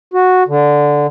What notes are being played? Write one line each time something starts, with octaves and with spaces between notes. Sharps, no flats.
F#4
D3